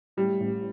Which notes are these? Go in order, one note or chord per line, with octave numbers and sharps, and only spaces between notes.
A2 G3
A1